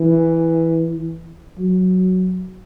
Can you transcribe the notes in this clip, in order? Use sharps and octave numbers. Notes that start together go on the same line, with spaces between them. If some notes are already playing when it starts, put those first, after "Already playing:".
Already playing: E3
F#3